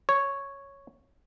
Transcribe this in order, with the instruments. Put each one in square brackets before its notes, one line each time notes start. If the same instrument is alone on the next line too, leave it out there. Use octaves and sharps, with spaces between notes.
[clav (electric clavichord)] C#5